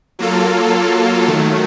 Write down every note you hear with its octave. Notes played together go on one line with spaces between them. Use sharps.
F#3 A#3 F4 A4
D#3 F#3 A3